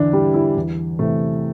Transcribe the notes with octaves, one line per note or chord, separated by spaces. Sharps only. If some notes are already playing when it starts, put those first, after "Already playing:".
Already playing: E2 D3 E3 D4 E4
E3 G3 G4
E3 E4
E2
C3 E3 A3